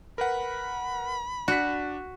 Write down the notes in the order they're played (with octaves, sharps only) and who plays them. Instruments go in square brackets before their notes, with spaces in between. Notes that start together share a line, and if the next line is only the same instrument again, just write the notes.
[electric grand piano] A#4 B4 F#5 [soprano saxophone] B5
[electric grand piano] D4 B6 [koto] F#4